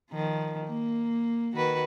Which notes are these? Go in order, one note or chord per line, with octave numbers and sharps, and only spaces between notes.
D#3 F3
A#3
D#3 F#4 B4